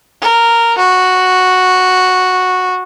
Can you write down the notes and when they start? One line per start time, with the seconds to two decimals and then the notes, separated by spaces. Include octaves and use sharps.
0.21 A#4
0.78 F#4